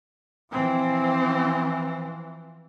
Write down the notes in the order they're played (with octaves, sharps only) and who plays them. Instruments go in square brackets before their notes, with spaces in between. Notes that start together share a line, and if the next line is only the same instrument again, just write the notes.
[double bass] E3 F3 [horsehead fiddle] C4